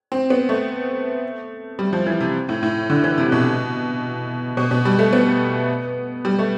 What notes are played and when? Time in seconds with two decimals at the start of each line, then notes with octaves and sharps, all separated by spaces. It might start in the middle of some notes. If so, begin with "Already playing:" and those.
0.12 C4
0.30 B3
0.49 A3
1.79 G3
1.93 F3
2.07 E3
2.21 C3
2.49 A2
2.63 A2
2.90 D3
3.04 E3
3.18 C3
3.32 B2
4.57 B2
4.71 B2
4.85 G3
4.99 A3
5.13 B3
6.25 G3
6.39 A3